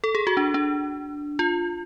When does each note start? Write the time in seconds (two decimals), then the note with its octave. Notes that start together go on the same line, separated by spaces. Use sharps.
0.04 A4
0.15 G#4
0.27 F#4
0.37 D4
0.54 D4
1.39 F4